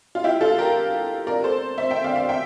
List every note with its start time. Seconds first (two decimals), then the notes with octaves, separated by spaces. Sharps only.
0.15 F4
0.24 E4 G4
0.41 F4 A4
0.58 G4 A#4
1.27 A#4 D5
1.44 A4 C5
1.78 C5 E5
1.91 E5 G5
2.04 D5 F5
2.16 D5 F5
2.29 E5 G5